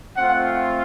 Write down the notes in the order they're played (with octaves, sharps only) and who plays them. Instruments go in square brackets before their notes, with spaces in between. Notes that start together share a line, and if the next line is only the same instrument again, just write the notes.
[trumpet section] A3 C4 F4 F#5